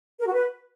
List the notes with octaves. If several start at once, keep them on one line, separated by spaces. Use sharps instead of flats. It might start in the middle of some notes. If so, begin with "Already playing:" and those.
A#4
F#4
B4